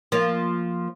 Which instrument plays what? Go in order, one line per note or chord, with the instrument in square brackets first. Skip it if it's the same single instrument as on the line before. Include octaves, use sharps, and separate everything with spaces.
[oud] F3 A#3 F4